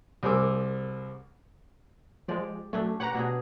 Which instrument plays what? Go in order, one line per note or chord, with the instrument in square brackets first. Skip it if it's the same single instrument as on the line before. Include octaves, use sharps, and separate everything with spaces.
[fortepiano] C2 C4 G#4 A#4 D6 E6
[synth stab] F3 G#3 [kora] G4 D5
[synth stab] F#3 A3 [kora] C#4 D4
[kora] G4 B4 C#5 [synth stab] F#5 A#5
[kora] B2 D4 G#4